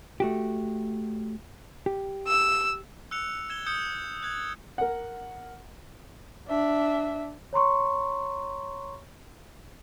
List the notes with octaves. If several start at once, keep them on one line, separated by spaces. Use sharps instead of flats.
A3 F#4 G4
G4
E6
E6 F#6 C#7 F7
G#6 E7 G7
D#6 G6 C#7 E7
F#6 G#6
A#4 F#5
D4 E5
C#5 A#5 C6 C#6